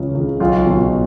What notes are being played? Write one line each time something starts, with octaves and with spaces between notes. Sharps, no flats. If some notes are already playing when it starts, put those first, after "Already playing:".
Already playing: C#2 C#3 E3
C#2
B1 F4
B2